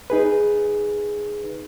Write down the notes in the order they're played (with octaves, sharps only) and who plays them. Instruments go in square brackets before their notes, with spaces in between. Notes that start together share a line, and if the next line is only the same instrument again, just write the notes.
[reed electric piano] D#4 G#4 B4